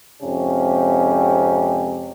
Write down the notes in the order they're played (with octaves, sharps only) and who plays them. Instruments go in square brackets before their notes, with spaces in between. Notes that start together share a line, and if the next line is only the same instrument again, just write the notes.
[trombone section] F2 G#2 C3 C#4